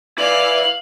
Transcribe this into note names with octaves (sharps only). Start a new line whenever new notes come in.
E4 B4 D5 F5 F#7